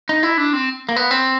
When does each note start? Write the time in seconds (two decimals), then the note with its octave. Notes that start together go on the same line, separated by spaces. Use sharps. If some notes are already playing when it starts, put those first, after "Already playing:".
0.09 D#4
0.23 E4
0.38 D4
0.53 C4
0.89 A#3
0.96 B3
1.11 C4